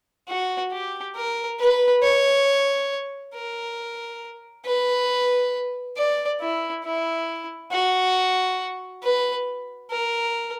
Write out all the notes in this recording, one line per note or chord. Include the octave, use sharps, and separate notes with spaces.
F#4
G4
A#4
B4
C#5
A#4
B4
D5
E4
E4
F#4
B4
A#4